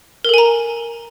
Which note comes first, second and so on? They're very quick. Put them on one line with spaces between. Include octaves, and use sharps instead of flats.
A#4 A4 G#5 A#5